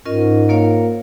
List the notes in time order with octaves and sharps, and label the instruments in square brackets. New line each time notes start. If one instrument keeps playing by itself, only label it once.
[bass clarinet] G#2 [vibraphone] C#4 F4 A#4 D#5
[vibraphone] A#3 F4 A#4 C#5 F5